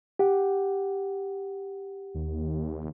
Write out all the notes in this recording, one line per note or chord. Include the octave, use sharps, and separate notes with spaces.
G4 F#5
D#2